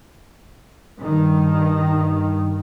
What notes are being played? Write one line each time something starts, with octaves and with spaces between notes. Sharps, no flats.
G2 D#3